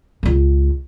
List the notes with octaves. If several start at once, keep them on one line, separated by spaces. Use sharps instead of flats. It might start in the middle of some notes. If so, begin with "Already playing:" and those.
C#2 C#3